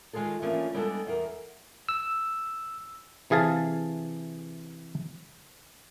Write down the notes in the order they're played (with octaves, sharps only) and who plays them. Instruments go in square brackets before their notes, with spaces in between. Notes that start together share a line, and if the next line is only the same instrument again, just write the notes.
[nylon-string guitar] D#3 G#3 F4 G#4 A4
E3 F3 A3 A#3 C#4 D4
G3 G#3 B3 D4 G4 A4
E2 A#4
[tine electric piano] E6
[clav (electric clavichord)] C3 E3 G#4 F5 A5